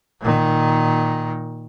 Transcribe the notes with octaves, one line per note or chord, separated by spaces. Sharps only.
A#2 D#3